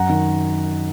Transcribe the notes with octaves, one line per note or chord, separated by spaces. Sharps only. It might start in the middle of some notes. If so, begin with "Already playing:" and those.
Already playing: F#2 F#5 A#5
D#3